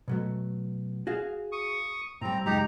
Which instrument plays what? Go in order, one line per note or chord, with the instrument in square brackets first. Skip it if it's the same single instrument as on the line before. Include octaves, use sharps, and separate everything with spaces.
[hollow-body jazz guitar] B2 F#3 A3
F#4 G#4 F5
[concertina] C#6 D#6
[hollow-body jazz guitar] A2 G3 [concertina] C4 A#5
[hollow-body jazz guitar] C#2 F#2 G#3 [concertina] D#4 G4 A#5